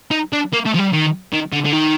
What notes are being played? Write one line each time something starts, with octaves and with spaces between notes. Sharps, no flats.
D#4
D4
A#3
A3
F3
G3
D#3
D#3
D3
D3
D#3